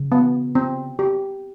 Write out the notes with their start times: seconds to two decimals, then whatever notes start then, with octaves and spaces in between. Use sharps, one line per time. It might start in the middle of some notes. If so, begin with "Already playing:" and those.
Already playing: C#3
0.12 B3
0.55 C4
0.99 G4